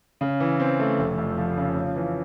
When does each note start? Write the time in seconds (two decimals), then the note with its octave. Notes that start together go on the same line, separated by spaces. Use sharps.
0.21 C#3
0.40 E3
0.60 C4
0.79 A3
0.98 F1
1.18 F2
1.38 F3
1.57 C#3
1.76 C#3
1.96 E3